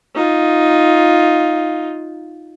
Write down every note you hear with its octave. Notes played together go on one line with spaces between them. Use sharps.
D#4 F4